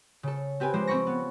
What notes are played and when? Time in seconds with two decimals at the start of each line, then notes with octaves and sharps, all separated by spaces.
0.23 C#3 A4
0.60 C4 G4 B4 G#5
0.73 F3 G#3 D4 G4 C5 D5
0.87 C4 C#4 B5 C#6 A#6
1.07 B3